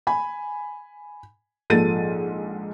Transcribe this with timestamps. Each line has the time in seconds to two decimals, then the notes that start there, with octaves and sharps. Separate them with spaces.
0.07 G#5 B5
1.70 A#1 G#2 F3 A4 A6 D#7